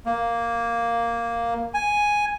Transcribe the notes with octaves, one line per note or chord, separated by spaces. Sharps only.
A#3
G#5